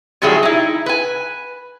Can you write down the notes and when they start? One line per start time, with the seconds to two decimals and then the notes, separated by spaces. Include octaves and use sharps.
0.22 C3 D#3 F#3 G3 E4 G#4
0.43 D#4 E4
0.86 B4 G#5